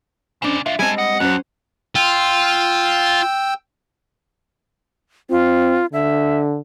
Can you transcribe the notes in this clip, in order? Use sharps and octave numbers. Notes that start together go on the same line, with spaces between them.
F2 C#3 C#4 D4 D5
D4 F4 E5
G3 G#3 C4 E4 A4 G#5
D#5 F#5
F2 F#3 C#4 C5 F#5
F4 G5 E6
C4 F4
D3 E5